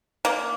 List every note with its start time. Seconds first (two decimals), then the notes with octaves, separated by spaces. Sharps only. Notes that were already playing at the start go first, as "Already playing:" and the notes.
0.25 A#3